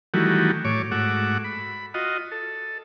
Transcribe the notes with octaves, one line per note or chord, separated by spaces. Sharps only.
D#3 E3 F#3 G3 A3 F#4
A2 C#5 D6
G#2 A3 F#4 F#5 D6 E6
B5
F4 F#4 D#5
A4